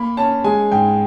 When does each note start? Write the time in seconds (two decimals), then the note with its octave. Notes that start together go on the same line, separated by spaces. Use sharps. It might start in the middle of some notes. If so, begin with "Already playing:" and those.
Already playing: A#3 B5
0.17 C#4 A5
0.44 G#3 G#5
0.72 G#2 G5